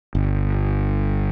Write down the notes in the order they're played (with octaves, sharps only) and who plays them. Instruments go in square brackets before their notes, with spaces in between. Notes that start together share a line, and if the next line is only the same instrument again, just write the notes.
[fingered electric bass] G1